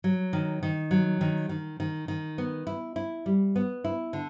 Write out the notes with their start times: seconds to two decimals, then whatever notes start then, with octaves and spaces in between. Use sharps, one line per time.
0.04 F#3
0.33 D#3
0.63 D#3
0.91 F#3
1.21 D#3
1.49 D#3
1.80 D#3
2.08 D#3
2.38 B3
2.67 E4
2.96 E4
3.26 G3
3.56 B3
3.84 E4
4.13 D3